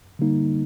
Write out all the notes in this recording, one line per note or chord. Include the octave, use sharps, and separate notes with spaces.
D3 G3 A#3 D#4